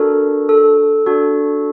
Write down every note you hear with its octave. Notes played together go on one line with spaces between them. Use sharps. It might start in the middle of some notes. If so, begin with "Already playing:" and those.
Already playing: D4 F#4 A4 A#4
A4
D4 F#4 A4